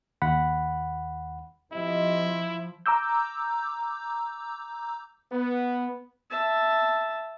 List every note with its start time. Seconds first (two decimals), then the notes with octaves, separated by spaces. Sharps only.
0.22 D#2 F#5 B5
1.72 F3 C4 E4 G4 D#5
2.86 A#5 D6 E6 G6
5.32 B3
6.31 E5 A5